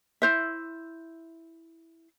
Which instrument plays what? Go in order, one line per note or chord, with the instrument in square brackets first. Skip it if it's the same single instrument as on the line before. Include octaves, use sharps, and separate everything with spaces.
[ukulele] E4 C5 E5